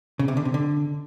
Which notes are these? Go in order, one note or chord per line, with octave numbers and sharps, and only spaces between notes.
C#3
C3
D3
C3
D3